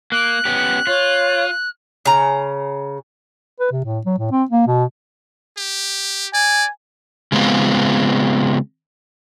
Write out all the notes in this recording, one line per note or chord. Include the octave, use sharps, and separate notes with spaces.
A#3 F#6
B3 C#4 G4
F4 C#5
C#3 A#5
B4
C3
A2
F#3
A2
C4
A#3
B2
G4
D5 G#5
C#3 G#3 B3 C4 F4